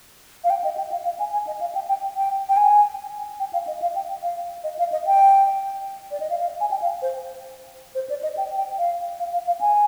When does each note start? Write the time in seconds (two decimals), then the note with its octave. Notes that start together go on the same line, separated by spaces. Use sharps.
0.44 F5
0.50 G5
0.64 D#5
0.77 G5
0.91 F5
1.05 F5
1.19 G#5
1.33 G#5
1.47 D#5
1.60 F5
1.75 G5
1.88 G5
2.16 G5
2.49 G5
2.57 G#5
3.40 G5
3.53 F5
3.67 D#5
3.82 F5
3.95 G5
4.22 F5
4.64 D#5
4.79 F5
4.92 D#5
5.06 G5
6.11 D5
6.20 D#5
6.30 F5
6.40 F5
6.60 G#5
6.71 G5
6.82 F5
7.02 C5
7.95 C5
8.09 D5
8.23 D#5
8.37 G5
8.57 G5
8.78 F5
9.19 F5
9.33 F5
9.47 F5
9.61 G#5